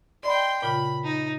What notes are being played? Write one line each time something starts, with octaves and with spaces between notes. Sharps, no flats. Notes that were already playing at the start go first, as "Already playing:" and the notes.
D5 D#5 G5 B5 C6
A#2 C#3 F4 B5
D#4